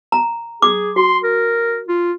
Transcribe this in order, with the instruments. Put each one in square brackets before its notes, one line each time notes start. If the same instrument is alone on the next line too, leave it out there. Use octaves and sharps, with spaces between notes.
[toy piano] A#5
[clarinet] G#4 [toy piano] D6
[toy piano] F#4 [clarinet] C6
[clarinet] A#4
F4